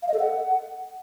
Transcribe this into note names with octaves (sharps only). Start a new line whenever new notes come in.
F5
D#5
A4
F#5